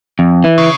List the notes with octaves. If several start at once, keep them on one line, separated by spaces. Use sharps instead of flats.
F2
E3
C#3